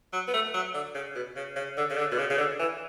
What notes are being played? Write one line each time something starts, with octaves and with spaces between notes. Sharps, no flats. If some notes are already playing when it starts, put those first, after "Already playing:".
F#3
B3
A3
F#3
D3
C#3
B2
C#3
C#3
D3
C#3
D3
B2
C#3
C#3
D3
E3